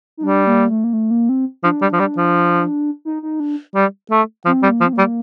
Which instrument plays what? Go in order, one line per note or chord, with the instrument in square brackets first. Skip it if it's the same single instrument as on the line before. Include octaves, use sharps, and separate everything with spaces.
[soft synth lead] D#4
[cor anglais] G3 [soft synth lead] D4
[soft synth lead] A#3
A3
A#3
A3
A#3
C4
[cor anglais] F3 [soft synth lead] D4
[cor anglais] G3
F3
G3
F3
[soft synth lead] D#4
D#4
D4
[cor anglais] G3
A3
[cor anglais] F3 [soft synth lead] C4
[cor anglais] G3
[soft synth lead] A#3
[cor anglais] F3
[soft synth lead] C4
A#3
[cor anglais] G3